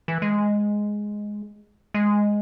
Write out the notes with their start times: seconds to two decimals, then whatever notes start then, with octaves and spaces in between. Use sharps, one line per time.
0.08 E3
0.22 G#3
1.94 G#3